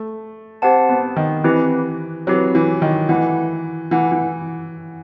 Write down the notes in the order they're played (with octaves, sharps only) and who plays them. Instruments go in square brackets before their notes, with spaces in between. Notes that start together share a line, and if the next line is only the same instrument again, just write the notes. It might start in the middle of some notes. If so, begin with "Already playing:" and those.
Already playing: [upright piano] A3
[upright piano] C4 [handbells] G4 C5 F#5 A5
[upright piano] B3
D#3
[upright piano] E3 [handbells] C4 E4 G4 B4
[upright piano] F#3 [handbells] C4 E4 G4 B4
[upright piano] E3
D#3
[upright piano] E3 [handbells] A3 E4 B4 F#5
[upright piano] E3 [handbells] A3 E4 B4 F#5
[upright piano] E3